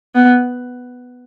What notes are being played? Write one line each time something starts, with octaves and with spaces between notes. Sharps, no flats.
B3